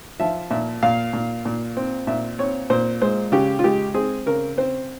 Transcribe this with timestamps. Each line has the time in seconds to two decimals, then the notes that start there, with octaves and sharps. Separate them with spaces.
0.20 F3 E5
0.50 A#2 E5
0.83 A#2 F5
1.13 A#2
1.45 A#2
1.77 C4
2.07 A#2 E5
2.39 C4 C#5
2.70 A#2 C5
3.01 G#3 C5
3.32 C#3 G4
3.59 F4
3.64 G#3 G4
3.94 C4 G#4
4.26 C#3 A#4
4.58 C4 C5